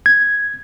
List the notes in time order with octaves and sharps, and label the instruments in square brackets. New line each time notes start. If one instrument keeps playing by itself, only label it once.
[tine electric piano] G#6